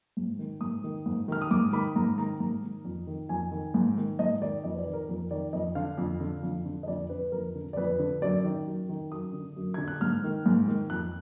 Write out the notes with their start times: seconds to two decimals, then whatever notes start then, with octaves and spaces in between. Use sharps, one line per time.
0.17 G#2
0.39 D#3
0.61 G#2 D#6
0.84 D#3
1.06 G#2
1.28 D#3 F6
1.42 D#6
1.51 G#2 D6
1.73 D#3 B5
1.96 G#2 A#5
2.18 D#3 A#5
2.40 G#2 A#5
2.63 D#3
2.85 F2
3.07 D#3
3.29 F2 G#5
3.51 D#3
3.74 G#2
3.97 D#3
4.19 G#2 D#5
4.42 D#3 D5
4.64 F2 D#5
4.75 B4
4.79 D5
4.86 D#3
4.93 A#4
5.09 F2 A#4
5.31 D#3 D5
5.53 F2 D#5
5.75 D3 F5
5.98 F2
6.21 D3
6.43 F2
6.65 D3
6.83 D#5
6.87 F2 D5
7.10 D3 B4
7.32 F2 A#4
7.55 D3
7.73 D5
7.77 F2 B4
7.99 D3
8.22 F#2 D5
8.44 D#3
8.67 F#2
8.89 D#3
9.12 F#2 D#6
9.33 D3
9.56 F#2
9.74 D3 G#6
9.88 F#6
10.01 G#2 F6
10.24 D#3
10.46 G#2
10.68 D#3
10.90 F2 F#6